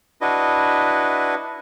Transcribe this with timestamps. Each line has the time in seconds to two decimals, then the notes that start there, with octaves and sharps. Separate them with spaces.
0.21 D4 E4 F#4 B4 D#5